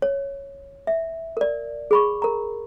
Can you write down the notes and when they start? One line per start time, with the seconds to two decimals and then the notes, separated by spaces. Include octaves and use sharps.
0.02 C#5
0.87 E5
1.37 A#4 D5
1.91 G#4 B5 C#6
2.22 A#4 A#5